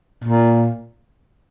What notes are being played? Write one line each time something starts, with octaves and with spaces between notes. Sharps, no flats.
A#2